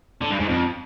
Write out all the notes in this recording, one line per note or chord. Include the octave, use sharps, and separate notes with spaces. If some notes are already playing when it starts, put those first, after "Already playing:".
D3
G2
G#2
F2